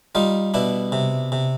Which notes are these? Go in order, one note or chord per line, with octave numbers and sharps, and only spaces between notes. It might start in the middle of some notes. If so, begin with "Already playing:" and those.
G3 D#4 F4
B2 D4 E4
C3
C3